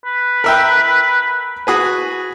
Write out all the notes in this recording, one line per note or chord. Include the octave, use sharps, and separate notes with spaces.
B4
A#4 E5 G5
F#4 G#4 B4